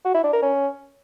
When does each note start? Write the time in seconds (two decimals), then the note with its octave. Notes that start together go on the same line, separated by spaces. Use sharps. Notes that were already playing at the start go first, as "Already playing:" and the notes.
0.05 F#4
0.14 E4
0.24 D4
0.33 A#4
0.42 C#4